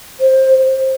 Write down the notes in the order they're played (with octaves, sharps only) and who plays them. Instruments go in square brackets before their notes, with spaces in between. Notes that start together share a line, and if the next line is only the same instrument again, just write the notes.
[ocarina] C5